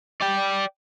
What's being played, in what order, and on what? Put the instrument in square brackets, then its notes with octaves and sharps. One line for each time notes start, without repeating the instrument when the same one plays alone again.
[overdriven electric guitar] D5 G5